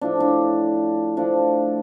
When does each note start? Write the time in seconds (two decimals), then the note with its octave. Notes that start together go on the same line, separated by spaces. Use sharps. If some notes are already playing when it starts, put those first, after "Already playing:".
0.01 A2 F3 A3 D4
0.20 D4
1.17 D3 F3 A3 D4